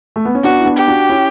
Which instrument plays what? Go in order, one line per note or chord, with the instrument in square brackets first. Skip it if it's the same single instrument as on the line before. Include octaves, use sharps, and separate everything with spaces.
[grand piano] A3
B3
C#4
[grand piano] B3 D4 [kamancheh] F#4
[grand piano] E4
B3 D4
[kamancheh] G4
[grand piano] D4 F#4
C#4 E4